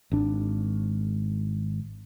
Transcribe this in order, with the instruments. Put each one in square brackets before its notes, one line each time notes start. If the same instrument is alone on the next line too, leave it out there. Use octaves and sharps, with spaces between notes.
[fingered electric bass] G#1 D4